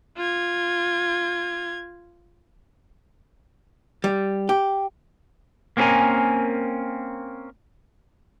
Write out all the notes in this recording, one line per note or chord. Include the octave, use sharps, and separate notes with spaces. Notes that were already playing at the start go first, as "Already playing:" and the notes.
F4 G#6
G3
G4
A#3 C4 C#4 F4 A#4 G#5